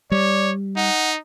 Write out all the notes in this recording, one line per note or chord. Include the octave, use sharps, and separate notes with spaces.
G3 C#5 D5
D#4 F#5